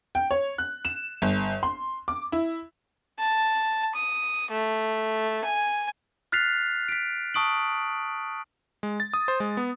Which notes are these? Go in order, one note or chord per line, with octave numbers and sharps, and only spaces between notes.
G5
C#5
F#6
E7
G1
C6
D6
E4
A5
D#6
A3
G#5
F6 F#6 A6 B6 C7 F7
B6 D7
A5 C#6 D#6 D7 F#7
G#3
A6
D#6
C5
G#3
B3